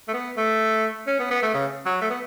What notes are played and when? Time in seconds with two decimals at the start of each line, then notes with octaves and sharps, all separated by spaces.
0.08 A3
0.13 B3
0.37 A3
1.07 C#4
1.19 B3
1.31 B3
1.42 A3
1.54 C#3
1.86 F#3
2.01 A3
2.10 B3